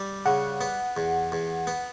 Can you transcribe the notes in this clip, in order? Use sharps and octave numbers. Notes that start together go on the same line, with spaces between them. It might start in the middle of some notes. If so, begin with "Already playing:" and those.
Already playing: G3
C#3 F#5
B3
E2
E2
B3